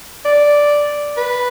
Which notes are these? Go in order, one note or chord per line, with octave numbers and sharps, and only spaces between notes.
D5
B4